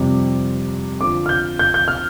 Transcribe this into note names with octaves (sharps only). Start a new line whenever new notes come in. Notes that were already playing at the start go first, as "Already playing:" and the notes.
Already playing: F2 C3 G3
F2 D3 F3 D6
F6
G6
G6
G6
F6